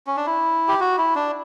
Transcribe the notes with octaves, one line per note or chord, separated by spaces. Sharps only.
C#4
D4
E4
G4
F#4
E4
D4